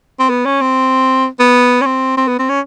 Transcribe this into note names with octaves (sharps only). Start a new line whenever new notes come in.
C4
B3
C#4
C4
B3
C#4
C4
C4
B3
C4
C#4